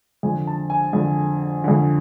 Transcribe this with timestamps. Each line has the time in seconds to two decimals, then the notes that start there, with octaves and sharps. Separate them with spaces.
0.23 F2 G#5
0.27 D3
0.47 A5
0.70 G#5
0.93 F2 D3
1.64 F2 D3